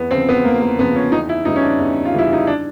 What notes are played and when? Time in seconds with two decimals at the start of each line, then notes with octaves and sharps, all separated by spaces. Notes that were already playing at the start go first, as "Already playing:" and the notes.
Already playing: E2 B3
0.11 C#3 F3 C4
0.29 B3
0.45 E2 A#3
0.62 A#3
0.79 C#3 F3 B3
0.96 C#4
1.12 E2 D#4
1.29 E4
1.45 C#3 E3 G3 D#4
1.56 C#4
1.63 D4
1.79 E2
2.05 F4
2.14 C#3 E3 G3 E4
2.33 D#4
2.47 D4